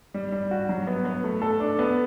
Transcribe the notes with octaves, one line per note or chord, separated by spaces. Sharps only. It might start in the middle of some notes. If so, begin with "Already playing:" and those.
G3
G3
F#4
F#3
B3
B3
A3
A4
D4
B3